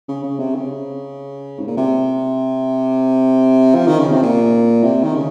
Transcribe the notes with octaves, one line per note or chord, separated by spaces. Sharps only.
C#3
C#3
C3
C#3
G#2
A#2
C3
F3
D#3
C#3
C3
A#2
C3
D#3
C#3